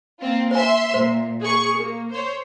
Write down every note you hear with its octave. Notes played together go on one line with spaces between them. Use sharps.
A#3 C4 F4
C5 E5 G#5 C6
A#2 C5
G#4 C#6
A#3
C5 C#5